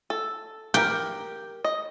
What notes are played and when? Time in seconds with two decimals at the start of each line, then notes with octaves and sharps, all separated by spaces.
0.10 A4
0.74 G4 A#4 G5
1.65 D#5